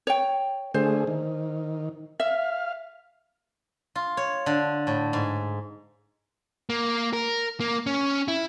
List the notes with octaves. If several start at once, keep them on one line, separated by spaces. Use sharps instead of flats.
C#5 G5
D3 A3 G#4 C5
D#3
E5 F5
F4
C#5
D3
A2
G#2
A#3
A#4
A#3
C#4
E4